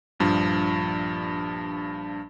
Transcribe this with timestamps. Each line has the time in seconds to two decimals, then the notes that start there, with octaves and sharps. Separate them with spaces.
0.20 A#1 G2 F3